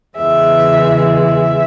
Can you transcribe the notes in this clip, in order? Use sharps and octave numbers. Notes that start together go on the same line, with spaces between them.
E2 C#3 E3 G#3 E5
E5